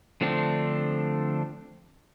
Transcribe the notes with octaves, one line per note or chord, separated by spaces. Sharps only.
D3 F3 A3 C4 D4